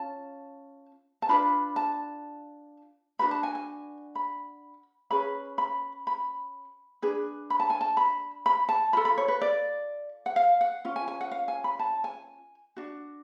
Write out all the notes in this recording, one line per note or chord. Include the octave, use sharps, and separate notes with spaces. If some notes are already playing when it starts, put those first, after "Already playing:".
Already playing: C#4 F4 A5
A5
D4 F4 B4 B5
A5
D4 F#4 B4 B5
A5
G#5
G#5
B5
C#4 G#4 B4 B5
B5
B5
D4 G#4 B4
B5
A5
G#5
A5
B5
B5
A5
F4 A4 B5
B5
C#5
B4
D5
F#5
F5
F#5
C#4 F4
G#5
G#5
F#5
F5
G#5
B5
A5
G#5
D4 F#4